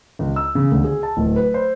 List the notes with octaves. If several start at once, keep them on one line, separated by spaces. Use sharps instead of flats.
C#2
E6
C#3
D2
G#4
A5
D1
B4
C5